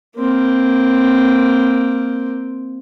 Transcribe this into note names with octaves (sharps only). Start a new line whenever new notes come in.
A#3 C4